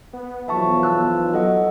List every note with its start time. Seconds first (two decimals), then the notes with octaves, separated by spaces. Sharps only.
0.13 B3
0.48 B1 E3 F3 E5 A5 C#6
0.83 A5 E6 F#6
1.34 F#3 A4 D#5 F#5